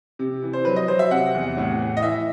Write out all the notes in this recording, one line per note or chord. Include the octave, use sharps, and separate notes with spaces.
C3
E3
C5
F#3 B4
D#5
F#3 C5
E5
C3 F#5
E2
A2
E3
D#5
E3 E5